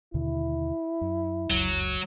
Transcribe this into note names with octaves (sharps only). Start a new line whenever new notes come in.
D#2 B2 D3 E4
F#2
F1 C#2 F#2 F#3